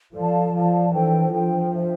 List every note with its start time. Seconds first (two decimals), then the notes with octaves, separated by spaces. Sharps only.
0.13 F3 A4 D5 F5 A5
0.52 F3 A4 D5 F5 A5
0.92 E3 D4 A4 C5 G5
1.30 F3 D4 A4 C5 G5
1.70 D4 F4 C5 E5